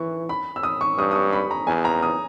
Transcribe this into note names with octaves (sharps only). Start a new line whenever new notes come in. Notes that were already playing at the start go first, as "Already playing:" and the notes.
Already playing: E3 C#6
B5
E6
D#6
C#6
G2 D#6
D#6
C#6
B5
A#5
E2 G#5
A#5
D#6